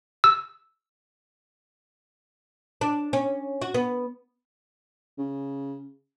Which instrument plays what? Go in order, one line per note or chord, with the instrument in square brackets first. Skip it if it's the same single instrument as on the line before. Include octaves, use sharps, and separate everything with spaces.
[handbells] E6
[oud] D4
C#4
F#4
B3
[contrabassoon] C#3